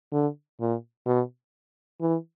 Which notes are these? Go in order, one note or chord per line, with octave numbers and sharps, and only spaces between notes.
D3
A#2
B2
E3